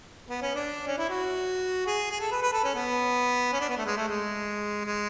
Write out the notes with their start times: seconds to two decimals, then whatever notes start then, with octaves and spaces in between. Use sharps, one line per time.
0.29 B3
0.42 C#4
0.55 D4
0.87 C#4
0.98 E4
1.10 F#4
1.87 G#4
2.11 G#4
2.20 A4
2.31 B4
2.42 B4
2.53 A4
2.64 C#4
2.75 B3
3.53 C#4
3.60 D4
3.69 B3
3.77 A3
3.86 G#3
3.97 A3
4.08 G#3
4.85 G#3